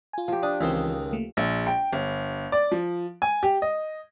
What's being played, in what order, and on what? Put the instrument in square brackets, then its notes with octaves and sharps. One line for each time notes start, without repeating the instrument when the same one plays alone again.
[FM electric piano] F4 G#5
[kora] F3 G4
[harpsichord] D4 [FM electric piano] D#6
[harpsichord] C#2 D#3 C6 [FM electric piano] E3 C4
[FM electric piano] A3 A#3
[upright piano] A#1
G5
G1
D5
F3
G#5
G4
D#5